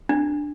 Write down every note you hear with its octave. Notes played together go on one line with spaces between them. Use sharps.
D4